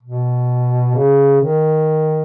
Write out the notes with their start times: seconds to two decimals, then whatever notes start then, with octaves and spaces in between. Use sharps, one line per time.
0.03 B2
0.95 C#3
1.41 D#3